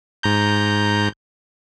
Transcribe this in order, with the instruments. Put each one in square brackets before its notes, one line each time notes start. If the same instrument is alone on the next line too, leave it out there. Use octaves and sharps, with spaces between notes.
[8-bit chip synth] G#2 A#5 G6